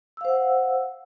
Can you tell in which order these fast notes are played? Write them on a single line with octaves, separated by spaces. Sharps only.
E6 F5 C5 F#5